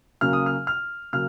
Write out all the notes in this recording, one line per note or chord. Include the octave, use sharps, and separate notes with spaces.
C#3 F#3 A#3 C#4 F6
D#6
F6
F6
C#3 F#3 A#3 F6